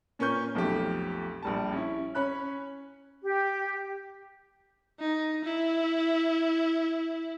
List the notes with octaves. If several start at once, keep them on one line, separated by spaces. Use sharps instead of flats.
A#2 C#4 A#4 B4 C#6 G6
B1 F2 A3 G4
A#1 G3 A5
C#4 E4
C#4 C#5 B5 F#6
G4
D#4
E4